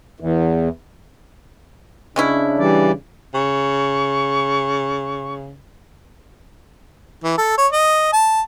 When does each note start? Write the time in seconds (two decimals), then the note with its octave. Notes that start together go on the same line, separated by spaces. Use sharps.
0.20 E2
2.16 C#3 G#3 C#4 D4 E4
2.59 E3 G3 D5
3.34 C#3 C#6
7.23 E3
7.38 A4
7.58 C#5
7.72 D#5
8.13 A5